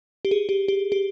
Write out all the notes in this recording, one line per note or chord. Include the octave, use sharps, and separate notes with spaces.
G4
G#4
G4
G4
G4